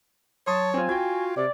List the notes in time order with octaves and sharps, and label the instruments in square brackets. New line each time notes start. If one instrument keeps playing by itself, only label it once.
[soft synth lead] F#3 [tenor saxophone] C#5 [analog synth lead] A5 [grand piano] C6 D#6
[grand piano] C4 F4 [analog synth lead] G#5
[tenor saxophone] F4 [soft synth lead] F#4 [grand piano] G5 G#6
[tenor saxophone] C3 [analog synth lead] D5